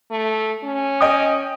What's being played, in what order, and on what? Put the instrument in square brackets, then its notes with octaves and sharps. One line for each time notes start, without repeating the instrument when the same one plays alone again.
[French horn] A3
C#4
[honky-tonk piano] D#5 G5 D#6